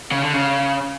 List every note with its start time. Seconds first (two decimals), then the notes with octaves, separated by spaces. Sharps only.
0.11 C#3
0.23 D3
0.34 C#3